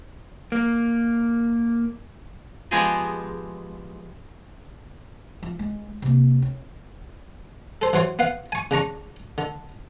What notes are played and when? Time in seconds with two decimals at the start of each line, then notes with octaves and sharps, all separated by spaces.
0.52 A#3
2.71 F3 G#3 B3 G4 G#4 D#5
5.43 F3
5.59 G#3
6.02 C3 A#3
6.42 C#4
7.82 A4 C5
7.93 E3 F#3 C5 C#5
8.19 B3 F5 F#5
8.52 G#5 C#6
8.71 C#3 D4 A#5 C#6
9.38 D3